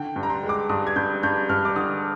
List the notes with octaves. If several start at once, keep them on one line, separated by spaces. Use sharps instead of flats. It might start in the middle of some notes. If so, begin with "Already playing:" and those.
Already playing: D3 G5
G2
A#5
C6
G#3
D6
G2 D#6
G#6
G2 G6
G2 G6
G2 F6
D6
D3 D#6